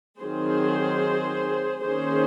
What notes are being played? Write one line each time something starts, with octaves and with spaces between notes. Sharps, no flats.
D#3 F#3 C4 G#4 C5
D#3 A#3 C#4 G#4 C5